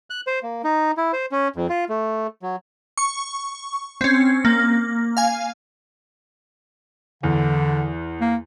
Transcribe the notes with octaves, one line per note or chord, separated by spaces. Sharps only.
F#6
C5
A#3
D#4
E4
C5
C#4
F2
F4
A3
F#3
C#6
C4 C#4
A#3
F5 G#5
E2 D3
A#3